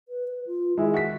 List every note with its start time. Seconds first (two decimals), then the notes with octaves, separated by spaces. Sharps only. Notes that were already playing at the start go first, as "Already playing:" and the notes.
0.08 B4
0.28 B4
0.46 F4
0.77 D#3 G#3 E4
0.94 F#4 B6